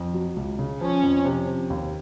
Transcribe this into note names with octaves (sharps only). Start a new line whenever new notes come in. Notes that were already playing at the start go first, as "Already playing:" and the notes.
Already playing: F2
F#3
C#2
C#3
F3 C#4
F2
C3
F3
D#2